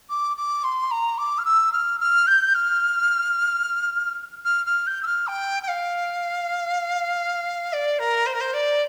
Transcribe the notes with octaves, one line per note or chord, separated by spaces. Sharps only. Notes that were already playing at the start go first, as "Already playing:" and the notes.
D6
D6
C6
A#5
D6
F6
E6
F6
F6
G6
F6
F6
F6
G6
E6
F6
G5
G5
F5
D5
A#4
C5
A#4
C5
D5